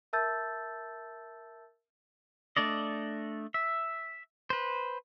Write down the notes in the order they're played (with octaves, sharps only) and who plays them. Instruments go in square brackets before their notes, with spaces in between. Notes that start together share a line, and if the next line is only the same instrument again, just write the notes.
[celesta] A#4 E5 A5 E6 G6 A6
[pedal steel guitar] A3 D4 D5 D#5
E5
B4 C5